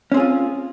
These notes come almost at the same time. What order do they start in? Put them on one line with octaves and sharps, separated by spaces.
C#4 C4 G#4 F4